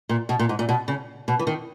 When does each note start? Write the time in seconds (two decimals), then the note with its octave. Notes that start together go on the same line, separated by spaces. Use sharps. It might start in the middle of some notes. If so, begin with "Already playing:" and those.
0.09 A#2
0.29 B2
0.39 A#2
0.49 G#2
0.59 A#2
0.69 B2
0.88 C#3
1.28 B2
1.39 E3
1.47 D#3